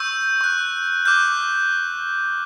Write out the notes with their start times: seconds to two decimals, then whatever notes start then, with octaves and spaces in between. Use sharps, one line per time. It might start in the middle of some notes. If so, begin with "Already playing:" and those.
Already playing: C#6 E6 G6
0.41 C#6 F#6
1.05 D6 F6 G6